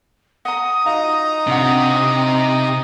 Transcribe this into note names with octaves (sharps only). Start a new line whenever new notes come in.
F#5 A#5 D#6
D#4 F4 F#4 F5 A#5
C3 D4 F4 F#5